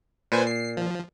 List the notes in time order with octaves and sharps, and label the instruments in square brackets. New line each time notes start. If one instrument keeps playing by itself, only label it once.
[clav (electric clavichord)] A#2 [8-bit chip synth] B4 C5 G#5
[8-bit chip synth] C7
F3